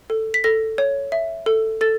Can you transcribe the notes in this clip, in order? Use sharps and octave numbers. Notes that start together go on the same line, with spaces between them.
A4
B6
A4 A#6
C#5
E5
A4
A4 A6